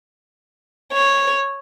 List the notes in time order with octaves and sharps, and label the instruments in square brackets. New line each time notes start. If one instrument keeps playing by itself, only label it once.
[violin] C#5